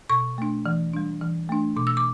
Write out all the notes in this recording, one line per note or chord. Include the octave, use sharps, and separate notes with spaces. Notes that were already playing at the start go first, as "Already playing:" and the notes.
B2 C#6
A3 D4
E3
G3 D4
E3
A3 D4
B2 D6
E6
D6